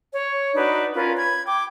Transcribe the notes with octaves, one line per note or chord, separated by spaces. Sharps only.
C#5
D4 D#4 F#4 B4
C#4 F4 A#4 B4
B5 G#6
G5 D6